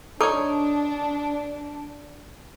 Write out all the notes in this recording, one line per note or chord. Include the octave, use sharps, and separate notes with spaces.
D4 D#4 A4 C#5 D6